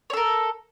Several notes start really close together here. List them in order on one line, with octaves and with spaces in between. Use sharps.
C#5 A4 A#4